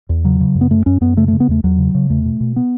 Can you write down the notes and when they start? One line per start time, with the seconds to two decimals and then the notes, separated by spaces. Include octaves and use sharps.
0.09 E2
0.24 C#3 F#3
0.40 C#3
0.55 F#2
0.61 B3
0.70 F#2 A3
0.86 F#2 C#4
1.01 F#2 B3
1.17 C#3 A3
1.28 C#3 A3
1.40 B3
1.48 E2 A3
1.64 E2 F#3
1.78 C#3
1.95 C#3
2.10 E2 A3
2.25 B2
2.40 B2
2.56 B3